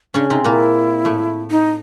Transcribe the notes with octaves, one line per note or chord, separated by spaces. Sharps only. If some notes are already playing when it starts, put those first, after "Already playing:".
C#3 C#4 D4
C3 C4 D#4
A#2 A#3 E4
A2 A3
D#4